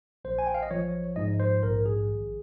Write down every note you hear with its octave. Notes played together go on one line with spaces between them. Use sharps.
A#1 C5
G#5
G5
F5
D#5
F3 C#5
G#2 D#5
C5
A#1 A#4
G#4
G#1